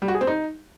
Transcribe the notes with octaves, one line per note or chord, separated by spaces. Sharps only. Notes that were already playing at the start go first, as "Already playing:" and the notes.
G3
F#4
G#4
C4
D#4